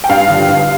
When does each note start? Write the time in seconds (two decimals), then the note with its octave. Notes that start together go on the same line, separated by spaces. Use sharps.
0.04 G5
0.09 G2 F5
0.29 D3 F3
0.49 G2